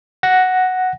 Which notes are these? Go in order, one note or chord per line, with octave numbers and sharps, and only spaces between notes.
F#5 A#6